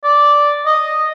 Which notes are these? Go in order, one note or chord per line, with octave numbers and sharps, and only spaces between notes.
D5
D#5